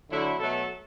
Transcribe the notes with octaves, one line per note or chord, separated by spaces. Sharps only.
D3 F#3 A3 E4
B2 F#3 A3 A4